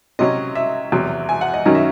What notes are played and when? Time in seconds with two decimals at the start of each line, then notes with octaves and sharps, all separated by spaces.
0.19 C3 F#3 C#4 D#5
0.55 E5
0.92 E2 C3 F#3
1.29 G#5
1.41 F#5
1.54 D#5
1.65 F#2 D#3 F#3 C#4 D#5
1.75 E5